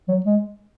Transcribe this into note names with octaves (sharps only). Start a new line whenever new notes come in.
F#3
G#3